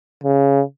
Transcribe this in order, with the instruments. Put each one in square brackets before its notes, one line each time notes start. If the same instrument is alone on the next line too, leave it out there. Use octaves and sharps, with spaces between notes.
[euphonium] C#3